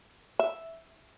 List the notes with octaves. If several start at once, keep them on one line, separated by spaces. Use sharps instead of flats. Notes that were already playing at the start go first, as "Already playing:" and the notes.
E5